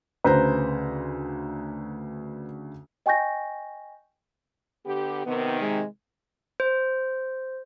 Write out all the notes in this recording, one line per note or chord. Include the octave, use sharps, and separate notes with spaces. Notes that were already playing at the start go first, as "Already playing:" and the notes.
D2 C#3 B4 C5 A#5
D#5 G5 G#5 C#6 G6 A#6
D3 B3 G4
C3 D#3 B3
G#3
C5